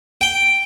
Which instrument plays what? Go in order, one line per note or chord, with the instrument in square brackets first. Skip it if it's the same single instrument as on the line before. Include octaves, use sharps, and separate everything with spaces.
[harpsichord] G5